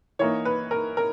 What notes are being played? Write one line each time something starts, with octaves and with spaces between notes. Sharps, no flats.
E3 A#3 D#4 C#5
B4
A#4
A#4